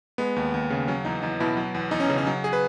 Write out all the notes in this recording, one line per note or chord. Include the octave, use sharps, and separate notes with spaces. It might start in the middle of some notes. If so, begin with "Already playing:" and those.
G#3 B3
D#2
D#2
C#3
F#3 C#4
E2 D#4
E2 D#4
B2 E4
F#3
E2
E2 D#4
C#4
C#3
C#4
F#3 D#4
G#4
B4